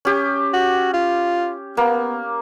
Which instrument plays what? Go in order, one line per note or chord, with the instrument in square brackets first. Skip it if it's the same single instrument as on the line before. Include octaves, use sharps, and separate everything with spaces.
[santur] C#4 G4
[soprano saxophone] F#4
F4
[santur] A#3 [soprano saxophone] B3